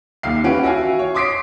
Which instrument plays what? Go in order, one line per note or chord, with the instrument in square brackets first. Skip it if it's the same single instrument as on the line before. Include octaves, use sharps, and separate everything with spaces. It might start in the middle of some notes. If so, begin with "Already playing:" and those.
[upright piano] D#2 E5 F5 C7
E3 C#4 G4 B4 F#5 D7
F#4 E5 F5 G#5
C#5
C6 D6 D#6 B6 C7 D7